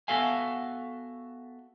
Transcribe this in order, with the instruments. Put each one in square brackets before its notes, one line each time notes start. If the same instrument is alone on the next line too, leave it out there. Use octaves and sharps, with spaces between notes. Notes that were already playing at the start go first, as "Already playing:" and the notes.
[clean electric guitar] B3 F#4 A4 E5 F5 G#5